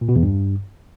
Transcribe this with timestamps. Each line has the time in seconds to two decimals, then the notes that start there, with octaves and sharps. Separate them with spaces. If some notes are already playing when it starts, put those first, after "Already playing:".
0.01 A#2
0.09 B2
0.16 E2
0.23 G2